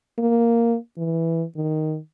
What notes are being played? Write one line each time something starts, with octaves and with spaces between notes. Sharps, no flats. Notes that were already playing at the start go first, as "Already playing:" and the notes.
A#3
E3
D#3